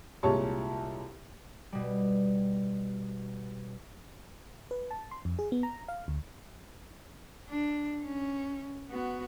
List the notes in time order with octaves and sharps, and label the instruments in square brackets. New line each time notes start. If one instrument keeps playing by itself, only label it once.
[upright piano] C2 A#2 G#3 C#5 A5 C#6
[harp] B2 G3
[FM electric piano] B4
A5
C6
F2
G#4
B3
A#5
F5
D2
[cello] D4
C#4
B3 F#4